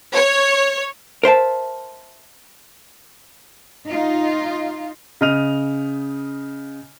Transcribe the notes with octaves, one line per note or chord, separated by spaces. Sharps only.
C#5
A#4 C5 E5 A5
D#4 F4
C#3 D#5 F6 D#7 F7